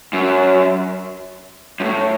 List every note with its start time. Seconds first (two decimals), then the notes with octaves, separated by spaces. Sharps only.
0.13 F#2
1.80 F#2
1.84 A2